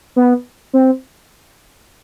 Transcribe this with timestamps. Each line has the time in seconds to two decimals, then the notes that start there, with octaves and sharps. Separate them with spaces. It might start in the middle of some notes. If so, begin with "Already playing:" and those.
0.16 B3
0.73 C4